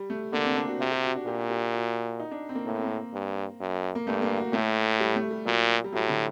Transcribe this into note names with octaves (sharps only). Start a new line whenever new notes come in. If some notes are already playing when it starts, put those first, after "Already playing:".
Already playing: G3
A3
D3 A#3
C4
D4
F#4
C3 F#4
G4
F#4
D4
A#2 G4
G4
F#4
D#4
D4
C4
A#3
A2 A#3
C4
A#3
G2
F#2
A#3
G2 A3
A#3
F#4
A2 A3
G3
A3
G3
A#2 F#3
G3
A2 F#3
D3